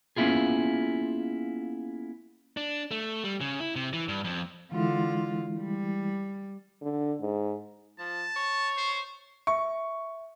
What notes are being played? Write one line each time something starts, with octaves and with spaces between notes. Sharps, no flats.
A#3 B3 C#4 E4 F4 G#4
D4
A3
G3
C#3
E4
C3
E3
G2
F2
D3 E3 G#3 E4 F4
G3
D3
G#2
F3 A5
C#5
C5
E5 C#6